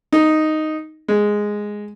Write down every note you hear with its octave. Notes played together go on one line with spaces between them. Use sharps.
D#4
G#3